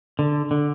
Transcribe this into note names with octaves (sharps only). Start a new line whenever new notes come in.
D3
D3